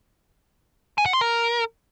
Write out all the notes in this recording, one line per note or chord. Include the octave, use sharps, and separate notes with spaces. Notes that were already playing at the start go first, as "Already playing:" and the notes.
G#5
F#5
C6
A#4